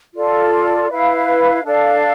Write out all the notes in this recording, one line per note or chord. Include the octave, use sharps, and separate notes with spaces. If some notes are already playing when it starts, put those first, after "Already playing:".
F4 A4 D5
E4 B4 F5
D4 A4 D5 F5